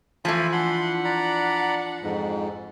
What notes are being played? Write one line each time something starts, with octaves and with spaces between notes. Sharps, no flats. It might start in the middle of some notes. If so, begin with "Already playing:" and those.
F2 E3 F3 A3 F5 G#5 B5
D4 F#5 B5 C6
D5 A#5 B5
F2 G#2